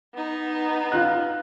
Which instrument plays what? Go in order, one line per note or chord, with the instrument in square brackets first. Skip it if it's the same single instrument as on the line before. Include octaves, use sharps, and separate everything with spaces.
[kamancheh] B3 D#4
[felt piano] F4 F#6